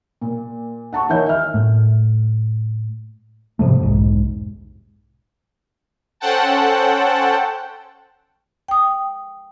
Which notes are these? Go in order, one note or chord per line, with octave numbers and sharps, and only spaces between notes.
A#2
F#5 A5 C#6
D#3 E3 A#4 C#5 G6
E5 F6
A2
G#2 C3 F3 A3
F1 B1 G#2
C#4 A4 C5 F#5 G5 A5
G5 D#6